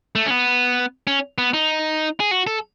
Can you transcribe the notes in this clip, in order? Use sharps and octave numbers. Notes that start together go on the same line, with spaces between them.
A3
C#4
B3
C#4
B3
D#4
G#4
F#4
A4